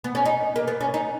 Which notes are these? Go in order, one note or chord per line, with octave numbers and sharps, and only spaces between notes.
B3
C#4
D#4
A#3
B3
C#4
D#4